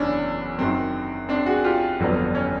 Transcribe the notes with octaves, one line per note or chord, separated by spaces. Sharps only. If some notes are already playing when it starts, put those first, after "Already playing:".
Already playing: F#1 E2 C#4 D4
F#2 D#3 F#3 C4
C4 D4
F#4 G#4
F4 G4
G1 F2 D3 F#3 B3
C#4